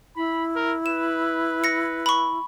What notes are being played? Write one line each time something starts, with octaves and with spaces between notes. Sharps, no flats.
E4 B5
A#4
B4 E7
A#6 C#7
B5 C#6